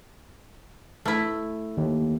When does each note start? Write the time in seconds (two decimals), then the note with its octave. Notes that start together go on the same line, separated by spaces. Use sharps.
1.05 A3 E4
1.77 D#2